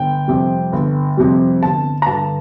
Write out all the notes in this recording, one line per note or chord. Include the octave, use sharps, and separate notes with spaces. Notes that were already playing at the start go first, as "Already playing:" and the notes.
Already playing: G1 G5
F2 C3 G3
G1
F2 C3 G3
G1 A5
A#5
G2 D3 A5